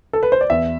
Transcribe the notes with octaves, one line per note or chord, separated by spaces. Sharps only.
A4
B4
C5
D5
E2 E5